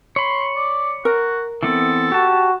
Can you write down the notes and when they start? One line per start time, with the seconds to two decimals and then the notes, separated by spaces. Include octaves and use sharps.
0.16 C#5 B5 C6
0.56 D5
1.05 F#4 A#4
1.63 E3 B3 C4 A4
2.12 F#4 G4 A5